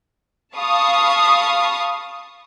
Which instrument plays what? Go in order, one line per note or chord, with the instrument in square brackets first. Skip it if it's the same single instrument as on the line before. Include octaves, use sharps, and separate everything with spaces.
[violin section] F5 A5 B5 C#6 D#6